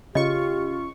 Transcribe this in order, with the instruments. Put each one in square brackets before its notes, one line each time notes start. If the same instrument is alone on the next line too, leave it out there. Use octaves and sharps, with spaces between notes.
[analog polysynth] C#3 C#6 [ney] F4 [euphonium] G4 [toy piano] D#5